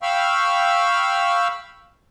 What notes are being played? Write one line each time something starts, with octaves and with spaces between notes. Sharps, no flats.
F5 G5 B5 C#6 E6 F6